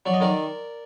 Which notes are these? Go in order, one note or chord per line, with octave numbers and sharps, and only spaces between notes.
F#3 D5
D#5
D#3 A#4 D5